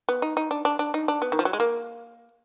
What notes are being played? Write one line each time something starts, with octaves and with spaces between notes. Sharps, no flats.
B3
D#4
D#4
D4
D4
D4
D#4
D4
B3
D#3
F3
F#3
G#3
A#3